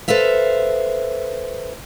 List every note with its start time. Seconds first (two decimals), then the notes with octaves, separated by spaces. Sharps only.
0.08 A4 B4 C5 E5 F5